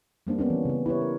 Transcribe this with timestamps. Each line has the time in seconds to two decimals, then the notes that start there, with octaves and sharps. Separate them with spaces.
0.27 G3 A#3 C4 D4
0.38 B3 C#4 D4
0.50 E3
0.65 C#3 B3
0.86 E4 G4 B4 C#5
1.01 A#4